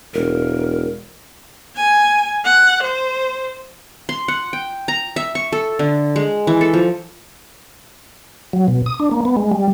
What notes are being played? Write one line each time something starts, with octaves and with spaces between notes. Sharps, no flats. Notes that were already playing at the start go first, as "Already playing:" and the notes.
E1 A#4
G#5
F#5
C5
C6
F#5
G5
A#5
E5
C#6
A4
D3
G#3
E3
A4
F3
F#3
B2
D#6
D4
A#3
B3
G#3
G3